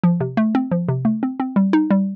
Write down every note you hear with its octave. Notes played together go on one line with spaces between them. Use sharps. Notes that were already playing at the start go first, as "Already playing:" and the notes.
F3
C3
A3
C4
F3
C3
A3
C4
C4
G3
D#4
G3